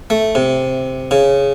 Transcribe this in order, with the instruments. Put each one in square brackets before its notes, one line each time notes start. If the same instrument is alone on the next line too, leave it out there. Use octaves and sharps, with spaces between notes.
[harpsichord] A3
C3
C#3